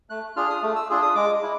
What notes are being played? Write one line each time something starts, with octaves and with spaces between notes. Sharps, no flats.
A3 F#6
D4 F4 G#4 F6
D#6
A3
E6
D4 F4 G#4
D#6
G#3 D6
E4